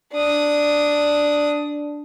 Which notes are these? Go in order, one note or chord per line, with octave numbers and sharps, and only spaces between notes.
D4 D#6